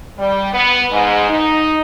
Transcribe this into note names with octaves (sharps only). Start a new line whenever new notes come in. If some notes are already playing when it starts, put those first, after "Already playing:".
G3
B3
G#2
D#4